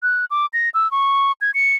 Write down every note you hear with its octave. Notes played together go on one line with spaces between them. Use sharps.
F#6
D6
A#6
E6
C#6
G#6
C#7